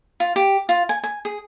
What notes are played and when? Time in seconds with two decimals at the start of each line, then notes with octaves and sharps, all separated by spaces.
0.20 F4
0.36 G4
0.69 F4
0.89 G#5
1.03 G#5
1.25 G#4